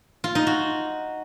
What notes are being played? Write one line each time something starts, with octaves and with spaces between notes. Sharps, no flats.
F4
D#4
F#4